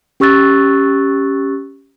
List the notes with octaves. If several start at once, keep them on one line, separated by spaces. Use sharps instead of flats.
C#4 G4 C#6 E6 F#6 A6